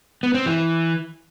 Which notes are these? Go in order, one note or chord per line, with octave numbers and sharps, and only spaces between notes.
B3
C4
E3